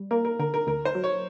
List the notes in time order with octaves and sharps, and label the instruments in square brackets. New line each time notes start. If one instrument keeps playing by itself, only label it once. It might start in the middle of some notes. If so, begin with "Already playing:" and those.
Already playing: [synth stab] G3
[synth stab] A#3 [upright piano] A#4
[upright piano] A#4
[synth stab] D3 [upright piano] A#4
[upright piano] A#4
[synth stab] D2 [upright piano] A#4
[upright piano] C5
[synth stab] F#3
[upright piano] C#5